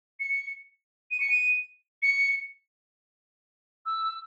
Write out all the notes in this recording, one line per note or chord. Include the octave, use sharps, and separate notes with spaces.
C#7
D#7
C#7
D#7
C#7
E6